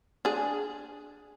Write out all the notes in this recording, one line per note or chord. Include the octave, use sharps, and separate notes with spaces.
D4 G#4